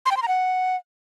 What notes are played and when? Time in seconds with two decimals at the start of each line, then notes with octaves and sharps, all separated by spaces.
0.06 C6
0.11 G5
0.17 C6
0.22 A#5
0.28 F#5